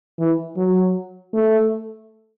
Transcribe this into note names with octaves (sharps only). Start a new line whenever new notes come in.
E3
F#3
A3